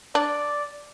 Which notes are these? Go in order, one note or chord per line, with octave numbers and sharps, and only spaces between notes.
D4 D5